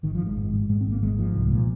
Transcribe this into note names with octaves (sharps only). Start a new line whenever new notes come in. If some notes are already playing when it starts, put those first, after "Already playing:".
G#1 D#3
F3
G#1
G#3
G#2
G#2
G#2 G#3
C4
G#1
A#3
G#1 G#3
G#2 F3
C2
A#2